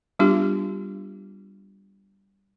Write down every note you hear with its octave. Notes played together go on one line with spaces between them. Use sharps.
G3 B3 D4 F4 G4